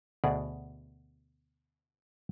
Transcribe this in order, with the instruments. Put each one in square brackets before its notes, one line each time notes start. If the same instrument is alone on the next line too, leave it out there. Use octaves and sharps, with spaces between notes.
[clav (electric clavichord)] D2 B2 G#4 D5